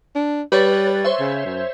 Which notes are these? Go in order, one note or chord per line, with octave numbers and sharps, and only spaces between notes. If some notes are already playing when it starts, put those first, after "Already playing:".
D4
G3 B4 C#5 A6
C5 C#5 E5
C#3
F#2